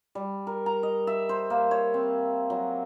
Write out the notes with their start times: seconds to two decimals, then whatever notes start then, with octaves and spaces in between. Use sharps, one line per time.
0.15 G3
0.47 A#4
0.66 A#5
0.83 D#5
1.07 E5
1.29 C5
1.50 A#3
1.71 C#5
1.94 C4
2.50 F#3